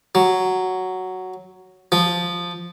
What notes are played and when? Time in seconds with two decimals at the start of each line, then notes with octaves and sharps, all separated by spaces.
0.15 F#3
1.92 F3